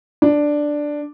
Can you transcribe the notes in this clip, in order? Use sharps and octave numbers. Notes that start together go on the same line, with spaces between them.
D4